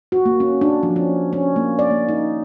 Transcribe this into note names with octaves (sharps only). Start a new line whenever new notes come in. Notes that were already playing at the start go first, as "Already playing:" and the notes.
F#4
A#3
C#4
D4
F3
C#4
C#4
A#3
D5
A#3
D#4